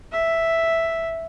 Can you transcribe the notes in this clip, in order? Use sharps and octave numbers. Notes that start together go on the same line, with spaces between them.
E5